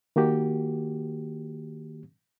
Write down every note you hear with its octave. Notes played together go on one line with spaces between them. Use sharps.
D#3 A#3 F#4 G4